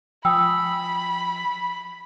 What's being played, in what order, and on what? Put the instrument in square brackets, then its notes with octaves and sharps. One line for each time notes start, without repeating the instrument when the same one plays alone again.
[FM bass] F3 [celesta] G5 G#5 D#6 [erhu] B5 [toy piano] E6